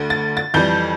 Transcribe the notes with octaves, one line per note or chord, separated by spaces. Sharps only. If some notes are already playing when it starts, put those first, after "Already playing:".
Already playing: D2 D3
A6
A6
F2 E3 G3 G6